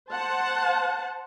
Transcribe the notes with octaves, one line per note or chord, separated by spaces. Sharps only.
C5 F#5 A5